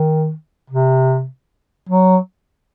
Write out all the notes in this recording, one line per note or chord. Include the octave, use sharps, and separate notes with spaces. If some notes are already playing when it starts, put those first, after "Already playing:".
Already playing: D#3
C3
F#3